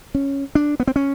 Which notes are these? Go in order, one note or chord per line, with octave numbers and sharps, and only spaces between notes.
C#4
D4
B3
C4
C#4